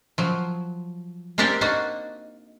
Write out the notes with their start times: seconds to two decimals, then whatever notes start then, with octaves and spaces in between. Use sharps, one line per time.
0.18 F3 F#3
1.38 A#3 C4 D4 G4 A4 A#4
1.61 A#3 D4 D#4 F#4